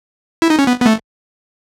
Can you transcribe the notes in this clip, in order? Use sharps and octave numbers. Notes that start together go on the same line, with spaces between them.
E4
D#4
C#4
B3
B3
A3